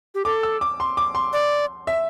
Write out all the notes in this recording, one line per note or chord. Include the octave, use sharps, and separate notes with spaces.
G4
A4 D6
E6
D6
C6
D6
C6
D5
E5